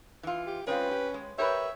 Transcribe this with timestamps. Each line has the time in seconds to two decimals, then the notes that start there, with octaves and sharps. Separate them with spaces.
0.23 E3 F4
0.46 G4
0.67 G#3 C4 C#4 F4 B4
0.91 G4
1.14 G#3
1.38 G4 A#4 B4 C#5 E5